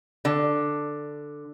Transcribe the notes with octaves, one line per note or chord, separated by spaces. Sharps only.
D3